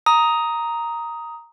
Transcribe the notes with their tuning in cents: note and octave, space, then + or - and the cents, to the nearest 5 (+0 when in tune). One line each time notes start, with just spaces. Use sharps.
A#5 +0 D#6 +10